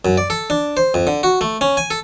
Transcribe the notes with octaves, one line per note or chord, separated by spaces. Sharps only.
F#2
D5
A4
D4
C5
F2
D3
F#4
A3
C#4
G#5
A4